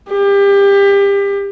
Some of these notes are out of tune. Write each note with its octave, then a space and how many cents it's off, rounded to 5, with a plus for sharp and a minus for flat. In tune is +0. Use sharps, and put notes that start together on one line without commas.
G4 +30